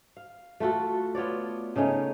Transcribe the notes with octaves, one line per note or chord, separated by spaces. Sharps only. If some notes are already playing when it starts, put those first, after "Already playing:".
F5
A3 F4 F#4 A4
B3 F4 C#5 D5
C#3 A3 C#4 D#4